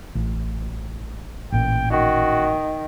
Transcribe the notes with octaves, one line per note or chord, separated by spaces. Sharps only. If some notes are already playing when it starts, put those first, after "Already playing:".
A1
A1 A#2 G5
D#3 F#4